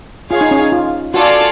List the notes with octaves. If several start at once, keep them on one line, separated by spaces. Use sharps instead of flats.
F4 G#4 C#5 F5 G#5
D#4
C#4
D#4
F4
F4 F#4 A4 D5 F5 G#5